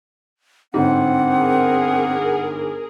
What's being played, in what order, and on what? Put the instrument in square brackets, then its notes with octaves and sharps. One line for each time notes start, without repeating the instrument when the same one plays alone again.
[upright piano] G1 G#2 [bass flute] C4 [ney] F#5
[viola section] G#4 A#4